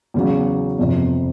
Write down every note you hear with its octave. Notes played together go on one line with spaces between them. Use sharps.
E2 C#3 F#3
G1 F2 C3